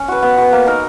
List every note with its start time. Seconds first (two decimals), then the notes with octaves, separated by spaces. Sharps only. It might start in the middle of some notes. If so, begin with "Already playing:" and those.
Already playing: C#4
0.08 F#4 B4
0.22 B3
0.37 F#4 B4
0.52 A#3
0.66 D#4 A#4